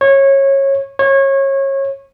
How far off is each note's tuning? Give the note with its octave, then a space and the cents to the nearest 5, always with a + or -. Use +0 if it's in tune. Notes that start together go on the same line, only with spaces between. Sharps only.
C#5 -20
C#5 -25